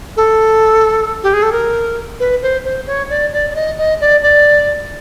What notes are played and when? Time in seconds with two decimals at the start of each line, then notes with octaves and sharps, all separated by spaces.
0.17 A4
1.23 G4
1.33 G#4
1.43 A4
1.52 A#4
2.20 B4
2.42 C5
2.65 C5
2.87 C#5
3.10 D5
3.33 D5
3.50 D5
3.55 D#5
3.78 D#5
4.01 D5
4.22 D5